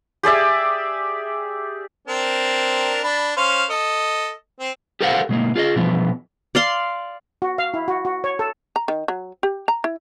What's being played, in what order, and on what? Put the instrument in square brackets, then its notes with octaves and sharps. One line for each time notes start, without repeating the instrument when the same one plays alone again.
[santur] G4 G#4 D5 E5
[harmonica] C4 D4 A#4
D4 B5
C#4 C5 F5
A4 D#5
C4
[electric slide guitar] G4 A4 A#4 C5 F5 F#5
B2 G#3 A#3
F4 G#4 D5 D#5
B2 E3 F3 B3
[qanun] D5 F5 C6
[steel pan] F#4
F5
E4
F#4
F#4
C#5
A4
[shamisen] A#5
D#3
F#3
G4
A#5
E4